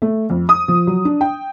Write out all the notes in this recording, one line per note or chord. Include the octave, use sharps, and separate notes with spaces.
A3
F2
D#6
F3
F#3
D4
G5